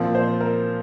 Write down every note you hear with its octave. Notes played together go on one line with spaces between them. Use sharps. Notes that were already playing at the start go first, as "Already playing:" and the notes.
Already playing: A#2 F3 C4 F4
C5
A#4